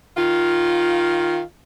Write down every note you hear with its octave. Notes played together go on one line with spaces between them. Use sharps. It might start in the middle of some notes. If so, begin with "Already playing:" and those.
D#3 F4